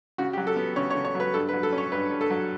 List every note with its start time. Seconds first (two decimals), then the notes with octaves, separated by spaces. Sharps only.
0.18 C#3 F#4
0.33 G4
0.38 F#3
0.47 A4
0.57 B3
0.76 C#3 C#5
0.90 C#5
0.95 C#3
1.05 C#5
1.15 F#3
1.20 B4
1.34 G2 A4
1.49 B4
1.53 F#3
1.63 A4
1.73 C#4
1.78 C#5
1.92 G2 B4
2.11 G2
2.21 A4
2.30 F#3